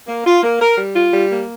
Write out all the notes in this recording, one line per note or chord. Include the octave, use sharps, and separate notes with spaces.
A#3
F4
A#3
A#4
G3
F4
G3
A#3